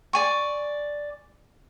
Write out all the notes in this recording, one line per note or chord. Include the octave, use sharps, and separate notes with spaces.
D5 G#5 C#6